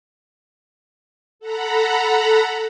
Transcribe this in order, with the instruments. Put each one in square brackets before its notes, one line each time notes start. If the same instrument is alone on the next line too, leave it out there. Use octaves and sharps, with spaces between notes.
[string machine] A4 F#5 A#5 B5